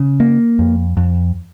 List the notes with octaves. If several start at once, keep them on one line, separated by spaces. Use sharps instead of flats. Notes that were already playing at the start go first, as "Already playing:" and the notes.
Already playing: C#3
A#3
F2
F2